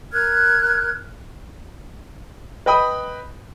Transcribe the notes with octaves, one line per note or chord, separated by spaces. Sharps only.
A#4 F6 F#6 G#6
B4 D#5 G5 B5 D#6